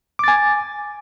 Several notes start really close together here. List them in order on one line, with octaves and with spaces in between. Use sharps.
D6 A6 G#5